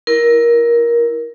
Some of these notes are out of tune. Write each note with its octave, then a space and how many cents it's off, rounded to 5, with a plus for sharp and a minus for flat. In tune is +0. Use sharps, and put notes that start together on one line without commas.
E4 +0 A#4 +15